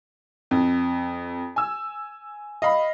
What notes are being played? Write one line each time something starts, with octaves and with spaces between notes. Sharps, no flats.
F2
G#5 E6
D#5 F5 B5